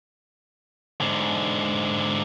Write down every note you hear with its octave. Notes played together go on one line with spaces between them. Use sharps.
G#2 D3